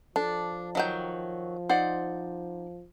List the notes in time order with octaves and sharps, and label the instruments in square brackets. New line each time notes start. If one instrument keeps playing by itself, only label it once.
[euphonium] F3 [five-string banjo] D4 [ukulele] A4
[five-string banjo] D#3 F#3 G5
[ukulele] D#4 D5 F#5 [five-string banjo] C5